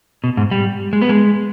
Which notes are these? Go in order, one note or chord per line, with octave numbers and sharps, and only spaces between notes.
B2
G#2
G3
G#3
B3
G#3